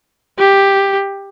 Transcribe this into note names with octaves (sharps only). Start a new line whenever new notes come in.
G4